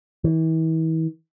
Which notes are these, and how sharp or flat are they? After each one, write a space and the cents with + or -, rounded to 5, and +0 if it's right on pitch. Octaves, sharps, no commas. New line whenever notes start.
E3 -40